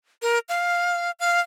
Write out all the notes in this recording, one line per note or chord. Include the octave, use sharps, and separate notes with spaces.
A#4
F5
F5